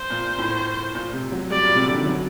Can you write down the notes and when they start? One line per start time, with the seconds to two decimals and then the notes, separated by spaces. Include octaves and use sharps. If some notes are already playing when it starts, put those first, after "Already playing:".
Already playing: C5
0.10 A#2
0.38 A2
0.95 A#2
1.13 C3
1.32 F#3
1.50 G3 D5
1.65 A#2
1.75 C3
1.86 D3
1.96 D#3
2.06 F#3